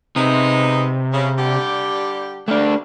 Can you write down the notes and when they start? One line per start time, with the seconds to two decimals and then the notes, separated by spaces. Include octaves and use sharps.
0.16 C3 G#3 B3 D#4
1.13 C#3
1.38 D3 G3 G4
2.48 G3 A3 A#3 D4